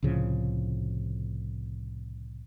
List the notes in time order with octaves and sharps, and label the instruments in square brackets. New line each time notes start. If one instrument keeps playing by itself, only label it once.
[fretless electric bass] C2 A2 C#3 F3